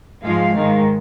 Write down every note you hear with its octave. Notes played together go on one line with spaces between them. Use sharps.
G#2 F3 G#3 F5
G#2 D#3 G#3